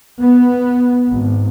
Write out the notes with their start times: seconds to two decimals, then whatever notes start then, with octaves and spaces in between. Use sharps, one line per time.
0.21 B3
1.10 G#1